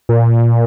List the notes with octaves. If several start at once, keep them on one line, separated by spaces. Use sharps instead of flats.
A#2